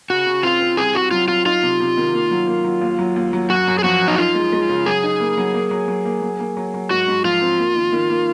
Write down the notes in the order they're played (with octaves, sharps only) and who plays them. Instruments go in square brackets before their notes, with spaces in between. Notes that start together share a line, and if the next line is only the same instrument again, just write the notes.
[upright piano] C#3 [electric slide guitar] F#4
[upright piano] C#3
[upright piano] C4 [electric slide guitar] F4
[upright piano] C4
[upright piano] C2 [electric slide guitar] G#4
[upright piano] C2 [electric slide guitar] F#4
[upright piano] F#3 [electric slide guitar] F4
[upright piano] F#3 [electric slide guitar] F4
[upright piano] D#4 [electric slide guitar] F4
[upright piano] C3
C3
D#3
A#3
F#3
A#3
F#3
D#2
F#3
D#2
F#3
[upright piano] F#2 [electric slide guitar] F#4
[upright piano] F#2
[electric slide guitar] G#4
[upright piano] F3 [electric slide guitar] F#4
[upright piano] F#2
[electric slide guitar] D#4
[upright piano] D#4 [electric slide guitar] F4
[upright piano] G#3
G#3
C#3
[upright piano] F#3 [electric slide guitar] G#4
[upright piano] D#4
A#3
F#3
A#3
F#3
F#3
A#3
F#3
A#3
F#3
F#3
[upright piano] G#2 [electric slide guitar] F#4
[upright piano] G#2
[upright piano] F3 [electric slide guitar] F4
[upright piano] C4
A#3
D#3
D#3
A#3